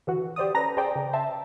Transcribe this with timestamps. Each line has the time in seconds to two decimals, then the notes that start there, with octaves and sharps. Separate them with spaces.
0.07 D3 E3 F#4
0.36 G4 C5 D5 D#6
0.54 C#4 A4 B4 A#5 A#6
0.77 G#4 C5 D5 G5
0.96 C#3
1.13 C5 E5 A5